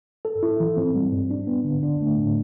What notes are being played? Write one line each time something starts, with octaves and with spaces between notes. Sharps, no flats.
A4
E4
E3
C4
G3
G2
D4
B3
D3
D4
A3
A2